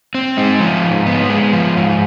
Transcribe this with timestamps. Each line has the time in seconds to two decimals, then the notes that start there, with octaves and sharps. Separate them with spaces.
0.15 C4
0.37 G#3 D#4
0.60 F3
0.84 G#2
1.07 B3
1.30 G#3
1.53 F3
1.76 G#2